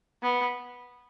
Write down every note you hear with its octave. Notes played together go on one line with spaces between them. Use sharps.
B3